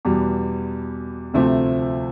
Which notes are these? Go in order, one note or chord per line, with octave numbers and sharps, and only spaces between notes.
E2 B2 G3
D2 C3 F3 A3 C4